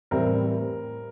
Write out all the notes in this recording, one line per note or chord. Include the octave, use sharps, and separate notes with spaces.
A2 E3 G3 C4 A#4